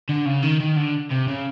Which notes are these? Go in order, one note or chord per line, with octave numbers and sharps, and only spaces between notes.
D3
C#3
D#3
D#3
D3
C3
C#3